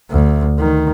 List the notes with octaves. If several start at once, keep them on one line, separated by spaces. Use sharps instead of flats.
D2
D#3